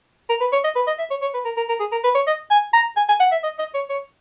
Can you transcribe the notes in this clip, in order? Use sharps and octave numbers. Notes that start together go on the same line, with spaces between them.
A#4
B4
C#5
D#5
B4
D#5
E5
C#5
C#5
B4
A#4
A#4
A#4
G#4
A#4
B4
C#5
D#5
G#5
A#5
G#5
G#5
F#5
E5
D#5
D#5
C#5
C#5